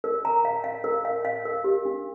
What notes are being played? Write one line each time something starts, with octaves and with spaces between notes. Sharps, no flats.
A#4
A#5
F5
F5
A#4
F5
F5
A#4
G4
D4